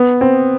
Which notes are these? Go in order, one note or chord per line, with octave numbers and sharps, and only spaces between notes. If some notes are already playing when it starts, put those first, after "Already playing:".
Already playing: B3
C4